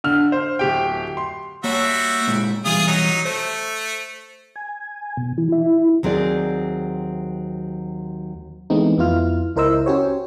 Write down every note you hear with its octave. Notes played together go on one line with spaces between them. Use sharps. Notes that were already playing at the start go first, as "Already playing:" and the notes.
D3 F6
C5
D1 G4 G5
C6
G3 A#3 F#4 C#5 E5
A#2 G#3 A#3
B1 E3 G3 F4 G#4 D#6
F#3 D#4
A3 C5
G#5
B2
E3
E4
D#2 F#3 C4 G#4 D5
E3 G#3 A3 B3 C4 D#4
F2 B3 E4 F4 F6
C#2 E4 A#4 C5 D#5 E6
C#4 F#4 G4 C5 C#5